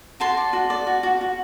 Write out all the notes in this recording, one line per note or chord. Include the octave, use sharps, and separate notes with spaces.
F#4 A5 C6
D5
F#4
D5
F#4
F#4
F#4